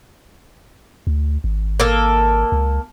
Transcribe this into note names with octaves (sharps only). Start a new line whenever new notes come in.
D2
G#1
A#3 A4
C#2